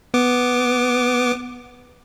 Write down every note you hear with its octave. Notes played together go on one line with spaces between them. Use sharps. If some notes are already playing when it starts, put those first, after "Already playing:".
B3 D6